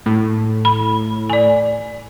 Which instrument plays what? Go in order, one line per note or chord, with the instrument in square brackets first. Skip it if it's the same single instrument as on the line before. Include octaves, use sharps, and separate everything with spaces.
[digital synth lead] A2
[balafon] B5
D5 G#5